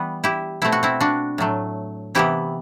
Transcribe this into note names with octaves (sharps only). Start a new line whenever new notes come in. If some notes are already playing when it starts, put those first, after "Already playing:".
Already playing: E3 G3 B3 B4
E4 G4
B2 A3 C4 E4
F#4
C4 E4
D4 F#4
A2 F#3 A3
C3 E3 B3 E4 G4